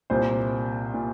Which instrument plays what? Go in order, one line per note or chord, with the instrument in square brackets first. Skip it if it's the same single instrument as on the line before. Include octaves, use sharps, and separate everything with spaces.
[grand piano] C2 A#2 C5
A#2